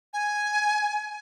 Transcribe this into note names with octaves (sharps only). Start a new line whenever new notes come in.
G#5